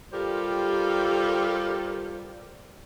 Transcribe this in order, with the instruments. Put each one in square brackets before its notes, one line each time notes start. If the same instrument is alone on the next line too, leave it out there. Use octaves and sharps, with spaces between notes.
[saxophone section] G3 F4 G4 A4 A#4 C5